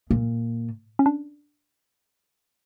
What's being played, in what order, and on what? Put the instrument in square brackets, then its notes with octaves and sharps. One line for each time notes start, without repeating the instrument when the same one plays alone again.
[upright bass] A#2
[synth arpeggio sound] C#4
D4